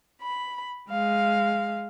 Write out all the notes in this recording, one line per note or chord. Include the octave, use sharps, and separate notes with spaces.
B5
G#3 F5